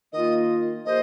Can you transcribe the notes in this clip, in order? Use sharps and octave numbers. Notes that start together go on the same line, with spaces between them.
D#3 A#3 F4 D#5
F3 A#3 G4 C5 D#5